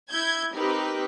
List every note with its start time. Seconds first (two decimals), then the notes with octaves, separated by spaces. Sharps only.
0.11 E4 G6 G#6
0.54 C4 D#4 G4 A#4 B4